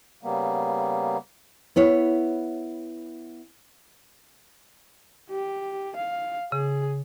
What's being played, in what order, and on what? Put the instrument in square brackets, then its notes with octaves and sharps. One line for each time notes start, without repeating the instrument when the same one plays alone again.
[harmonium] C#3 G3 A#3 B3
[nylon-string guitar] B3 E4 C#5
[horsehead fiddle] G4
F5
[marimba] C#3 [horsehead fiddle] G#4